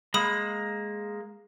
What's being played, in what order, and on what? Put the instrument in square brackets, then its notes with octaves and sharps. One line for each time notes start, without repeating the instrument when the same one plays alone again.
[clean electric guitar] G#3 A#3 [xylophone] B5 D#6